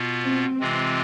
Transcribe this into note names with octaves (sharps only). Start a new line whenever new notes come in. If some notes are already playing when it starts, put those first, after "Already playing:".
Already playing: B2 B3 F4
C4
C3 E3 G#3 C4 F4